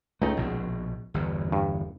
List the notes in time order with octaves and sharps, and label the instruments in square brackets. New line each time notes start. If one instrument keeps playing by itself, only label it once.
[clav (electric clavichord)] C#2 D#4 [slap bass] A3
[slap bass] A#1 B2
G1 E2
[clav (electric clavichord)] G2